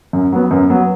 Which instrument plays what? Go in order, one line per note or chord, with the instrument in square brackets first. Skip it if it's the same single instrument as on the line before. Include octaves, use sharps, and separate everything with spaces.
[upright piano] F#2
F#3 B3
F#2
F#3 B3